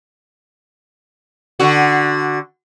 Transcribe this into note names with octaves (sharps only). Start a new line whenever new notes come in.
D3 F#4